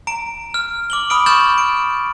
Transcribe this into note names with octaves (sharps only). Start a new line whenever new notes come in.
A#5 D7
F6
D6 F#7 G7
B5 D#6 F6 D7
C#6 F6 G6 A6 E7 F#7
D7